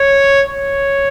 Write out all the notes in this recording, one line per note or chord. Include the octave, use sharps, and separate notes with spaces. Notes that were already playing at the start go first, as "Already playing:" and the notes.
Already playing: C#5
C#5